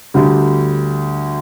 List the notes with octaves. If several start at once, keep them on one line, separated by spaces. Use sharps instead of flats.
D2 D3 G3